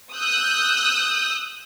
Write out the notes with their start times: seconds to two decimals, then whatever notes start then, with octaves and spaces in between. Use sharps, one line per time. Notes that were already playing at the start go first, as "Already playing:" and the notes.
0.14 D#6 E6 F#6 G6